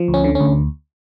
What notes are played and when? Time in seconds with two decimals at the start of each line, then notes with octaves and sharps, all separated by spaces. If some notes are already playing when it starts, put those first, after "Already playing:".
Already playing: F3
0.08 D2
0.14 C#4
0.24 D3
0.35 C#4
0.41 D2